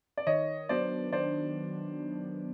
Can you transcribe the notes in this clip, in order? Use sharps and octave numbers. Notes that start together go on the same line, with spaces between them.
D5
D#3 C#5 D#5
F#3 B3 D4 C5 D5
D#3 C5 D5